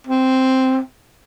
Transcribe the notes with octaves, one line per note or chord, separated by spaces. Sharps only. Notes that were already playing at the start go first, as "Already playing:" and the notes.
C4